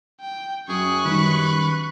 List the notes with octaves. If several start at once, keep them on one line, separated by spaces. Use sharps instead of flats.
G5
F#2 G#4 C#6 F#6
D#3 G3 B4